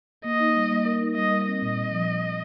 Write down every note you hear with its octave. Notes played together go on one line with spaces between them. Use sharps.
A#3 D#5
D#4
G3
A#3
A#4
D#4
G3 D#5
A#4
C4 D#5
A#2
A#2
F3